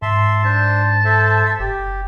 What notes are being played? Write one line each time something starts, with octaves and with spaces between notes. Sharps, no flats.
G#2 E5 A5 C6
D4 C5 A5
A4 C5 E5
E5 E6
F#1 G4